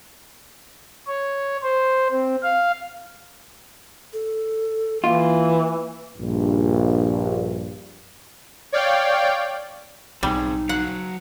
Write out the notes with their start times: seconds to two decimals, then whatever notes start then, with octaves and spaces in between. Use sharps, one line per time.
1.08 C#5
1.63 C5
2.10 C4
2.43 F5
4.13 A4
5.04 E3 A#3 F4
6.18 A#1 G2
8.72 C#5 D5 F5 G5
10.23 B1 G3 C4 D#4 G#4
10.69 F#3 F5 F#5